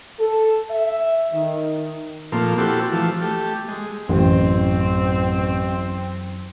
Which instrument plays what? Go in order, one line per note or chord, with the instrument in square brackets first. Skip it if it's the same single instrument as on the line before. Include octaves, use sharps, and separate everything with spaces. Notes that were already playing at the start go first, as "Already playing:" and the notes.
[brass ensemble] A4
E5
D#3
[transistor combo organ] A#2 F3 A3 A#3 C4
C4 E4 F#4 G4 A4
E3 F3 A3
A3 G4
G#3
[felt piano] A1 [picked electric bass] F#2 E3 [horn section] C4